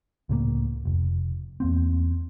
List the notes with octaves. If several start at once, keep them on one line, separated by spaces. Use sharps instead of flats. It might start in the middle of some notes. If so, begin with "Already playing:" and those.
C#2 A2 G3 A#3
F1
E2 A#3 C4